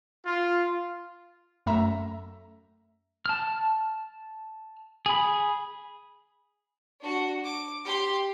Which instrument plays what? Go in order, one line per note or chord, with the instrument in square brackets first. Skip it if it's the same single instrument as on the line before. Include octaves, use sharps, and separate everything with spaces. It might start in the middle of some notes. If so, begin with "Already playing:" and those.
[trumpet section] F4
[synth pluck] F#2 A3 E5 A#5
[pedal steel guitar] A5 F6
G#4 B5
[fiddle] D4 F#4
D6
G4 C6